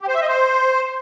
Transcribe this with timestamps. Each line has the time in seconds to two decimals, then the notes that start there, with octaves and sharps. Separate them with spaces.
0.01 G4
0.08 C5
0.15 E5
0.21 D#5
0.28 C5